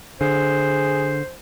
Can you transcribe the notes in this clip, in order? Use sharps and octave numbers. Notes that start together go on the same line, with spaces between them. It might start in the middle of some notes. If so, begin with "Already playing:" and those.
D3 G#4 C5